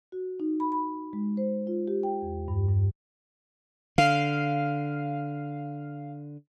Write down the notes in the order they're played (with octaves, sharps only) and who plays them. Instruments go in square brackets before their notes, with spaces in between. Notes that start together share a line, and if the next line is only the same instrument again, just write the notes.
[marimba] F#4
D#4
B5
B5
G#3
C5
F4
G4
G5
E2
G2
G2
[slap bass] D3 [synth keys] F5